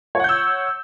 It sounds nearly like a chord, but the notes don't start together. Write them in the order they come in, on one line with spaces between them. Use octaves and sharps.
C#5 F#5 G6 E6